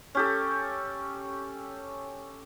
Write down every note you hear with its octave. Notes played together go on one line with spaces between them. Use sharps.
C#4 G4 A4